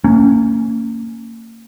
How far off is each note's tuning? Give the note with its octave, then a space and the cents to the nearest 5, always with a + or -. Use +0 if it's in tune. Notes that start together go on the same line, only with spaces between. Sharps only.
A#3 -35 C#4 +0